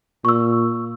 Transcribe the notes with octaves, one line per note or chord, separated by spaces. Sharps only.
A#2 C#6 E6